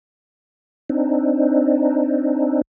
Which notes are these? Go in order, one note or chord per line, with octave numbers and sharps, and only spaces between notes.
C4 D4 D#4